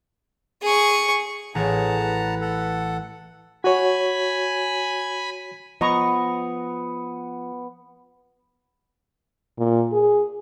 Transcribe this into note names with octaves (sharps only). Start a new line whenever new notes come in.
G#4 C#6
A1 G#4 C#5 F#5 A5 A#5
B4
A4 F#5
F#4 C#5 G#5 B5
F3 B3 D#5 A#5 B5 C#6 D#6 C#7
A#2
G#4